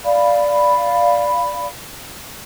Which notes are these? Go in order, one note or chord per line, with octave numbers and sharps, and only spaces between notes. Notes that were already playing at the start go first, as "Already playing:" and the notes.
D5 F5 B5